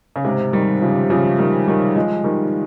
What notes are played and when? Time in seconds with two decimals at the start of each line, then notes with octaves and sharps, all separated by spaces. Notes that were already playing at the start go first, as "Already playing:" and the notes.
0.16 C#3
0.24 G#2 C3
0.53 D#3 G3
0.82 C#3 F3
1.10 C#3 F3
1.39 D#3 G3
1.68 D#3 G3
1.96 F3 G#3
2.24 D#3 G3